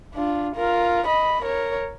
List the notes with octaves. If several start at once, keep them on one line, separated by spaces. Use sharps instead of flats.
D4 F4
F4 A#4
D#5 B5
A#4 C#5